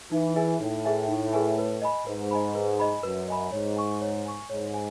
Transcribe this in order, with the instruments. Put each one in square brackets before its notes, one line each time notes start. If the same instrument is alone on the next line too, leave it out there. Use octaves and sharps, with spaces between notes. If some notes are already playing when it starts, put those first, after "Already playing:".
[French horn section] E3 [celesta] D#4
[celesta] G#4 B4 E5 G#5
[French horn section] A2 [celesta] D#4
[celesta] G#4 B4 E5 G#5
D#4
G#4 B4 E5 G#5
B4
D#5 G#5 B5
[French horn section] G#2 [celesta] B4
[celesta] D#5 G#5 B5
B4
D#5 G#5 B5
[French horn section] F#2 [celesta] B4
[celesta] D#5 G#5 B5
[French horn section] G#2 [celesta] C#5
[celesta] G#5 C#6
C#5
G#5 C#6
[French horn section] G#2 [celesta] C#5
[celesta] G#5